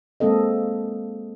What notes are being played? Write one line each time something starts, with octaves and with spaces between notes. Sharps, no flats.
G#3 A#3 C4 A4 D#5